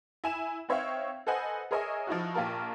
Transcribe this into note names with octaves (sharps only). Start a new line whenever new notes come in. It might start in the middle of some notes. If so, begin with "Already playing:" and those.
E4 G#5 E7
C4 D#4 C#5 E5 F5 G5
A4 B4 C5 D#5 F#5 G#5
G#4 A#4 C#5 D#5 E5 G#5
F3 D#4 E4 F#4
A#1 A#3 F4 G4 A#4 A5